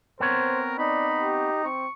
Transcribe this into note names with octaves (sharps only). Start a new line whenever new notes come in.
B3 C4 A#4 C5 C#5
D#4 D5 B5
G4
C4 C#6